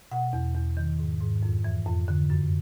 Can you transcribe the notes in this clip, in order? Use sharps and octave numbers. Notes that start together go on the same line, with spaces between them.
B2 F#5
E2
E2
D#3
G#2
G#2
F2
E3
F2
D3
F#2